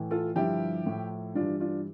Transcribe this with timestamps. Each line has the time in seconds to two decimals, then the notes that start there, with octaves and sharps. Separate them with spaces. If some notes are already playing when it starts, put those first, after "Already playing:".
Already playing: A2 E3
0.11 F4 A4
0.36 G2 D3 F3 E4 G4
0.86 A2 F3
1.35 G2 E3 D4 F4
1.60 D4 F4